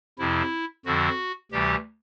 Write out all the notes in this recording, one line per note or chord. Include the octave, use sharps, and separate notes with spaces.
F2 C3 F3 E4
F2 D3 F3 F#4
D2 C3 E3 G3 G4